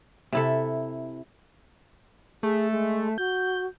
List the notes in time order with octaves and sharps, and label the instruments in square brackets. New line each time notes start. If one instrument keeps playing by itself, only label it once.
[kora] C3 E4 A4
[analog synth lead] A3 [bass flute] G#4
[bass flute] G#3
[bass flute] F#4 [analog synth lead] G6